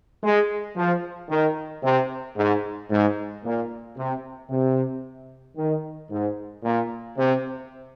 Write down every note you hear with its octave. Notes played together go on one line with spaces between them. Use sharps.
G#3
F3
D#3
C3
G#2
G#2
A#2
C3
C3
D#3
G#2
A#2
C3